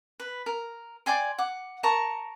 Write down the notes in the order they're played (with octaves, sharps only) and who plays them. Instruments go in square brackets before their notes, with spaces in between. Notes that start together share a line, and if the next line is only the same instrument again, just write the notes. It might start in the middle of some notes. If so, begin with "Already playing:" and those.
[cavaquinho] B4
A#4
D5 G5 G#5 C6
F#5 D6
A#4 A5 A#5 C#6